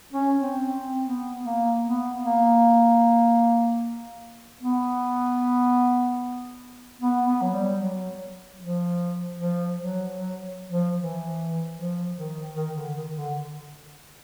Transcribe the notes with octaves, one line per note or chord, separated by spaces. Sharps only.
C#4
C4
C4
B3
A#3
B3
A#3
B3
B3
B3
F#3
G3
F#3
F3
F3
F#3
F#3
F3
E3
F3
D#3
D#3
D3
D#3
D3